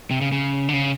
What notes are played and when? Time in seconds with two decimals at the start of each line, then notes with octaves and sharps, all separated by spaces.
0.11 C3
0.21 C#3
0.32 C#3
0.69 D3
0.73 C#3